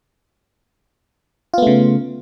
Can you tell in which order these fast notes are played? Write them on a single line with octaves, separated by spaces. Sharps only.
F4 B3 A3 C#3